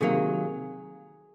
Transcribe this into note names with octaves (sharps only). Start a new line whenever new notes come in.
C3 D#3 F#3 A#3 G#4